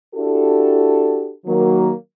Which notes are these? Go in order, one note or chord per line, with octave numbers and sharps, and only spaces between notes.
D4 E4 F#4 G4 A4
D#3 F#3 A#3